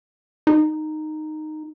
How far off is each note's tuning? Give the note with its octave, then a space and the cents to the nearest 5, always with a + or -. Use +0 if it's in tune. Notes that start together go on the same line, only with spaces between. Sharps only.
D#4 -10